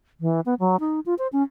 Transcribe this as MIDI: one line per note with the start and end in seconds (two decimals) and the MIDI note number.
0.20 0.40 52
0.46 0.54 59
0.60 0.76 54
0.80 1.00 63
1.06 1.14 65
1.18 1.27 72
1.32 1.43 61